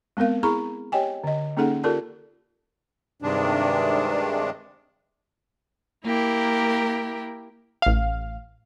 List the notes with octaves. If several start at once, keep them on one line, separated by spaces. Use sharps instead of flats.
G#3 B3 C4 A#4 F5
E4 G#4 A#5 B5 C#6
G4 C#5 D#5 G5 G#5
D3 D#5
A#3 C#4 D#4 G#4 A4 F#5
F4 G4 A4 A#4 D5 A5
G2 C3 D#3 G#3 D4
A#3 E4 G4 A#4
A1 F5